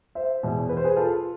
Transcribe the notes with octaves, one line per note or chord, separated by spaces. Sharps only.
C5 E5
E2 B2
B4
C5
G#4 B4
F4 A4